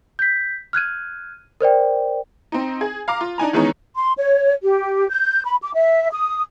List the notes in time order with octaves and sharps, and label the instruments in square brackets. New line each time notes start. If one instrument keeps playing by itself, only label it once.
[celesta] G6 B6
F6 F#6 G#6 D#7
A#4 C5 D5 G5
[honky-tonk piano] C4 D#4
G#4
F5 A#5 D6
F4
D4 D#4 G#5 A#5
D#3 E3 G#3 B3 C#4 D#4
[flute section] C6
C#5
G4
G6
B5
D6
E5
D#6